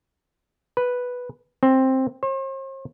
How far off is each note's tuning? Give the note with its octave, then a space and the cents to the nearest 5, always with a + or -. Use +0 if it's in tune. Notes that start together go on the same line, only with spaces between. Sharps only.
B4 -5
C4 +10
C5 +45